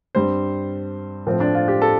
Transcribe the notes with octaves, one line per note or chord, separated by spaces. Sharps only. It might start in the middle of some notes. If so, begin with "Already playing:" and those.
G2 G3 C4 C5
A2 F3 C4
D4
F4
G4
A4